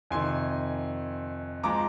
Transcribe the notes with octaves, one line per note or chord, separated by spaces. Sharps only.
F2 C3 D#3 G#5 C6
F3 G#3 A#5 D6